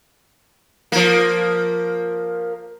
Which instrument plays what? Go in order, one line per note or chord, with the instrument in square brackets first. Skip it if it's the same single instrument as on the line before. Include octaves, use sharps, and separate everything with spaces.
[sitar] F3 A#3